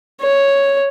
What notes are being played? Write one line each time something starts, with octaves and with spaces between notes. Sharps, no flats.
C#5